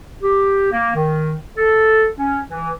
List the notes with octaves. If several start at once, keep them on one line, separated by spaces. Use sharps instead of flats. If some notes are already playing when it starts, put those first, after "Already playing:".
G4
A#3
D#3
A4
C#4
E3